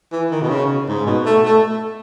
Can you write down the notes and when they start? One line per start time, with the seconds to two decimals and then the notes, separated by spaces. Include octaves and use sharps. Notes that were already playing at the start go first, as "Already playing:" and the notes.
0.12 E3
0.31 D#3
0.42 B2
0.49 C#3
0.88 G#2
1.06 B2
1.25 A3
1.45 A3